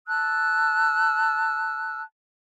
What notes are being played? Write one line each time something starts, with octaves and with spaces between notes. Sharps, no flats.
A5 E6 F#6